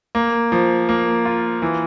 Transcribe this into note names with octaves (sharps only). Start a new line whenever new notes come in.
A#3
F3
A#3
F4
E3